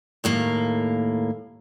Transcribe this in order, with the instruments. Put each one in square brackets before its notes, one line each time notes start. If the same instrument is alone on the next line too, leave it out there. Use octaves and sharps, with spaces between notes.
[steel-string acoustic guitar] D#2 A2 A#3